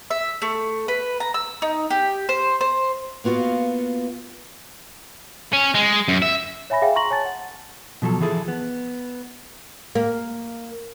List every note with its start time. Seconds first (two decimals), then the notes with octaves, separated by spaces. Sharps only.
0.10 E5
0.42 A3
0.88 B4
1.20 A#5
1.34 E6
1.62 D#4
1.90 G4
2.29 C5
2.61 C5
3.24 A#3 B3 F4 F#4 F5
5.53 C#4
5.75 G#3
6.08 F#2
6.22 E5
6.70 C#5 E5 G#5 B5 A#6
6.82 G#4 E5 F5 G5 G#5
6.96 A#5 C6 C#6 A#6 F#7
7.10 C#5 G#5 A5 A6
7.25 F#5
8.02 B2 F3 F#3 A4
8.20 E3 F3 E4 G#4 A4
8.48 B3
9.95 A#3